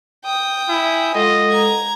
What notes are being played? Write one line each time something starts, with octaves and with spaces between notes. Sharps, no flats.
G5 D#6
E4 G#5
G#3 F4 A4 D#5 F#5
A#5 G#6